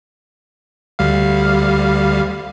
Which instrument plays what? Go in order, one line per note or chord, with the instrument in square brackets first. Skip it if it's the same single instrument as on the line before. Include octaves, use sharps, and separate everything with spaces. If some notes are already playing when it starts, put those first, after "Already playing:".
[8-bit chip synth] D2 G3 F5